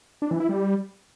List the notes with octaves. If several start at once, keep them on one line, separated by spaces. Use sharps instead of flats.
D4
E3
E4
G3